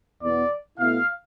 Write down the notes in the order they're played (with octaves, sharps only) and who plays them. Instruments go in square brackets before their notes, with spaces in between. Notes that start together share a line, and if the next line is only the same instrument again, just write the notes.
[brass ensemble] E2 B2 B3 D5
B2 A3 E4 F5